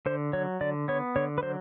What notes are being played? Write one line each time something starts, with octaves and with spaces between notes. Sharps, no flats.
D3 C5
F#3 C#5
D3 D5
B3 C#5
D3 C#5
B4
F#3 C5